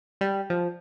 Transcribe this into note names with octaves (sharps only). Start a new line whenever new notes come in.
G3
F3